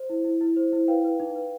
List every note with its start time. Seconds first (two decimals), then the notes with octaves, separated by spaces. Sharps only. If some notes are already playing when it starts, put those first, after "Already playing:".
Already playing: C5
0.10 E4
0.24 E4
0.41 E4
0.56 C5
0.72 E4
0.88 B4 F5 G5
1.04 B4
1.20 D#4
1.35 B4